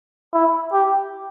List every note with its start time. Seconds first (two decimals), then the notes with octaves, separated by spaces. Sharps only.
0.34 E4
0.73 G4